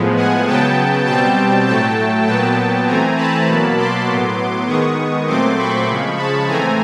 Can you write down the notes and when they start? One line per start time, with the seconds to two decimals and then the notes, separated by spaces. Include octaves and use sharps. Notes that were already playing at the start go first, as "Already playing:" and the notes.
Already playing: A2 F3 G#3 B3
0.16 F#5 G#5
0.46 C#3 F#3 B3 G5 A5
1.06 B2 G3 C4 G5 A5
1.67 A2 F#3 A3 G5 A5
2.26 A#2 F#3 B3 G5 A5
2.87 E3 A3 C4 G#5 A#5
3.16 A5 B5
3.47 B2 F#3 A#3
3.77 C6 D6
4.07 A2 F#3 B3
4.67 D#3 G#3 B3 C#6 D#6
5.27 A#2 F#3 A3 C4 C6 D6
5.57 B5 C#6
5.87 C#3 F3 G#3
6.17 A5 B5
6.47 A2 E3 A3 C4 G#5 A#5